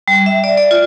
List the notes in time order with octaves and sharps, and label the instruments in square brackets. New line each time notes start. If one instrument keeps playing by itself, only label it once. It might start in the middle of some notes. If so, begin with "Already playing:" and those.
[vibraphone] G3
E5
D5
D5
F4